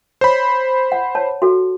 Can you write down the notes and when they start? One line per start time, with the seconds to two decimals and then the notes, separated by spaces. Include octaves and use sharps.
0.21 C5 C#5 B5
0.92 F#5
1.15 C#5 A5
1.42 F#4 A4